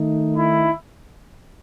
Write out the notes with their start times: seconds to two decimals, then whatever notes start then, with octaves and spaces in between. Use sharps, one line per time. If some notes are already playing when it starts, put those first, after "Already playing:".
Already playing: D#3 A3 D#4
0.36 E4